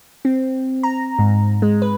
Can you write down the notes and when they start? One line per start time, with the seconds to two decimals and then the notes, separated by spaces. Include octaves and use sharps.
0.25 C4
0.83 A#5
1.19 G#2
1.62 G#3
1.82 B4